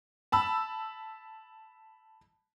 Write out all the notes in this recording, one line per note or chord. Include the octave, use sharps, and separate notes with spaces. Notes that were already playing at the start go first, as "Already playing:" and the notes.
A5 B5 E6